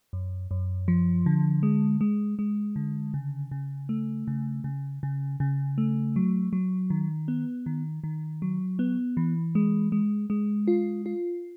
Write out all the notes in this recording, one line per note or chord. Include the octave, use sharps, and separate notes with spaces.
F#2
F#2
F3
D3
G#3
G#3
G#3
D3
C#3
C#3
A3
C#3
C#3
C#3
C#3
A3
F#3
F#3
D#3
B3
D#3
D#3
F#3
B3
E3
G#3
G#3
G#3
F4
F4